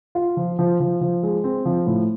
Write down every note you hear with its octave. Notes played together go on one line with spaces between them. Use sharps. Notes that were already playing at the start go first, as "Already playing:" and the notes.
F4
F3
F3
F3
F3
G#3
C4
F3
A2